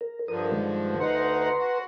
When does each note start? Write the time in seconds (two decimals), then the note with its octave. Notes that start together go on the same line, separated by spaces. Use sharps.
0.01 A#4
0.28 G2 D3 F3 A#4 D#6
0.52 D#3 G#3
1.00 D2 D#4 B4 F#5 A#5 C6
1.59 F#4